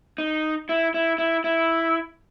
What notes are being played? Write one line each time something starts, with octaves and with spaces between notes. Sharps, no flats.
D#4
E4
E4
E4
E4